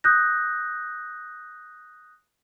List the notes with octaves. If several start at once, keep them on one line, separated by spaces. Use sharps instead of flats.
D#6 F#6 G6 A#6